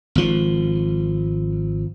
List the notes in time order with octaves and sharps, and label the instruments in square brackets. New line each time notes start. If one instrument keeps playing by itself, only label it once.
[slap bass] G#1 F3